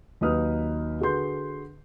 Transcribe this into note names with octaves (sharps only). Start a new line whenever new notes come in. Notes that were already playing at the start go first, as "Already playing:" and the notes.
D#2 F#3 D#4 B4 D#6 F6
D3 F#4 G#4 B4 C6 G6